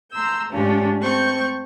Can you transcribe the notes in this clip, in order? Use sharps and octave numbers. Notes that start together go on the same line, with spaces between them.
A3 A#5 C6 E6 G6
G#2 A3 C#4 D4 F4 G4
A3 C4 C#6 G6